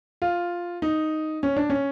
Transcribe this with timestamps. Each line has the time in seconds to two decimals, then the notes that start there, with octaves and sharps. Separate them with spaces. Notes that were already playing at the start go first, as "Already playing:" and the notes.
0.22 F4
0.82 D#4
1.43 C#4
1.57 D4
1.70 C#4